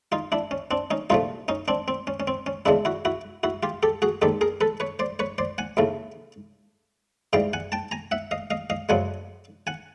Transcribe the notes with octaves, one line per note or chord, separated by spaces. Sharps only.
D#4 F4
D4 E4
C#4
C4 D4
C#4 D#4
C2 A#2 F3 A3 D#4 F4
C#4 D#4
C4 D4
C4
C#4
C#4
C4
C#4
E2 C#3 E3 G#3 D4 E4
E4 F#4
E4 F#4
E4 F#4
F4 G4
G4 A4
F#4 G#4
D#2 D#3 G#3 G4 A4
G#4 A#4
A4 B4
B4 C#5
C5 D5
B4 C#5
C5 D5
F#5 G#5
D#2 C#3 E3 A3
G#2 E3 G3 F5 G5
F#5 G#5
G5 A5
G#5 A#5
E5 F#5
D#5 F5
D#5 F5
D#5 F5
F#2 C#3 F3 G#3 F#5 G#5
F#5 G#5